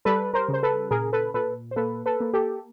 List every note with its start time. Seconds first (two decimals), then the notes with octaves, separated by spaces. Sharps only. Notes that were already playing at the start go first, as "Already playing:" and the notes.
0.05 G3 A4 B4
0.34 A#4 C5
0.48 C#3
0.53 C5
0.63 A4 B4
0.91 A#2 G#4 A#4
1.13 A4 B4
1.34 A#2 A4 B4
1.71 C5
1.76 A#3 A4 B4
2.06 A4 B4
2.20 A#3
2.33 G4 A4